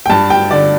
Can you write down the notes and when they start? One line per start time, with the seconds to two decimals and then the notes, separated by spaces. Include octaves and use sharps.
0.06 G5
0.10 G2 A5
0.30 G5
0.51 D3 D5